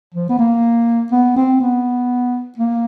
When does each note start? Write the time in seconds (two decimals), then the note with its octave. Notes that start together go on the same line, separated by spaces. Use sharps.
0.15 F3
0.29 B3
0.39 A#3
1.12 B3
1.36 C4
1.61 B3
2.58 A#3